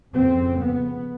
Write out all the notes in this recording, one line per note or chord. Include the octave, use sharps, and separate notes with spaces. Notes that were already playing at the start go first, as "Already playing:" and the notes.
F2 C#3 C4
B3